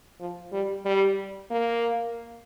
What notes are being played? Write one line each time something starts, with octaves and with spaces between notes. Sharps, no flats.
F3
G3
G3
A#3